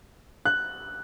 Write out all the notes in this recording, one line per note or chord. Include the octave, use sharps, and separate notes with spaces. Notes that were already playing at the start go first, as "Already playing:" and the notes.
F#6